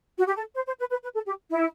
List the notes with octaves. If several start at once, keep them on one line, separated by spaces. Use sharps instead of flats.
F#4
G4
A4
C5
C5
B4
B4
B4
A4
G4
E4